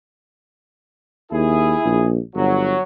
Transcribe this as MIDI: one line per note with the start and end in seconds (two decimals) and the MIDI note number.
1.32 1.75 39
1.32 2.08 64
1.32 2.08 68
1.85 2.18 34
2.35 2.74 31
2.35 2.83 54